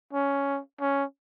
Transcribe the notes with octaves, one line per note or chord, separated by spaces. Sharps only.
C#4
C#4